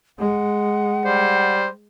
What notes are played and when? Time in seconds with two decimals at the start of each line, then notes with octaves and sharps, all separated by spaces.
0.18 G#3 F#5
1.05 G3 C5